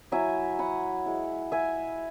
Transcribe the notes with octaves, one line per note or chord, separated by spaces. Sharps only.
F#3 E4 E5 G#5
F#5 B5
G#3 E4
E5 G#5